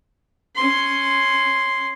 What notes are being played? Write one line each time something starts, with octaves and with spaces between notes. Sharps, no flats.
C#4 C6